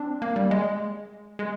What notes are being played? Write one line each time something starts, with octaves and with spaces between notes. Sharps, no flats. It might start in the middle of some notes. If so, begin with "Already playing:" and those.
Already playing: C4 D4
A#3
G3
G#3
G#3